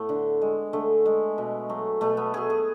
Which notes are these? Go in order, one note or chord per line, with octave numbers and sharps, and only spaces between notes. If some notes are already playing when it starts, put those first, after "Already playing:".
Already playing: A2 A3 B3
D3
G#3
D3 A3
G#3
B2
F#3 A3
B2 A3
B3
F#3 A3 G#4
G#4